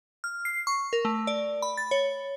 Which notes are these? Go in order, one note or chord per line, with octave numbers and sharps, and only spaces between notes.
F6
C7
C#6
A#4
A3
D5
B5
A6
C#5